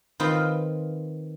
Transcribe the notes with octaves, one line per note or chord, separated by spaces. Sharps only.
D#3 C4 F4 B4